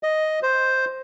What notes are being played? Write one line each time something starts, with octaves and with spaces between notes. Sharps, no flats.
D#5
C5